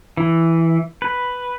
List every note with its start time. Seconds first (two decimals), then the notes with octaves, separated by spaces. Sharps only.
0.17 E3
1.02 B4